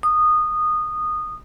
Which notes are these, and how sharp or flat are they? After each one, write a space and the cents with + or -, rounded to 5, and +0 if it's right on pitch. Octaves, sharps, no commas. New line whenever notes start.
D#6 -15